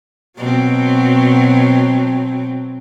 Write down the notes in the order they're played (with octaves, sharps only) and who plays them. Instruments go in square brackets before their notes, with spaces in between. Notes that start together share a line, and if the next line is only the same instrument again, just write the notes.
[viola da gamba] B2 F#3 C4